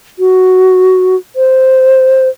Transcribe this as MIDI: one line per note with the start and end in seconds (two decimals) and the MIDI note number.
0.19 1.16 66
1.36 2.29 72